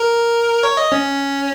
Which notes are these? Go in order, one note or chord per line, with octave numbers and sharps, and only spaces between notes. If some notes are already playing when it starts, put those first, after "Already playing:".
Already playing: A#4
C#5
D#5
C#4